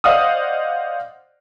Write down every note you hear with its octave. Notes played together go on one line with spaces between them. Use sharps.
C5 D5 D#5 F5 F#5 D#6